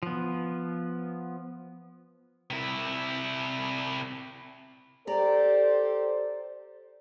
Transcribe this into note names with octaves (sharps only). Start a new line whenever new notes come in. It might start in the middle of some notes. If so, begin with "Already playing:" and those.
F3 B3
C3 E4
G4 A4 C5 D5 A#5